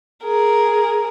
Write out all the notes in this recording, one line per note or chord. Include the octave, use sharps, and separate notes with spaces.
G#4 A#4